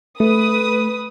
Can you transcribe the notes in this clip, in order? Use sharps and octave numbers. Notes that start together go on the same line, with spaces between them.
A3 B4 D#6